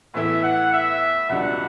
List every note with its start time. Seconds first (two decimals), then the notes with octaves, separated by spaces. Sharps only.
0.14 A2 E3 B3 E4 A4 E5
0.43 F#5
0.72 E5
1.29 C#2 B2 G3 D4 F#5